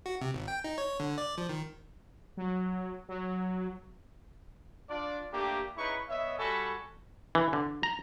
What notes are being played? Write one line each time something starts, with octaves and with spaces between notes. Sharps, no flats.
F#4
C3
G#1
G5
D#4
C#5
D3
D5
F3
D#3
F#3
F#3
D4 F4 D5
A3 A#3 D4 G4
C#4 D#4 E4 G#4 B4 C#6
B3 C#5 D#5 E5
G3 F#4 A4 G#5 B5 C#6
E3
D3
A#5